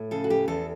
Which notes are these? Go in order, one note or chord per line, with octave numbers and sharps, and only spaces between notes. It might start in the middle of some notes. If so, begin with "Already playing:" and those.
Already playing: A2
C#3 A4
F#4
G4
E2 A4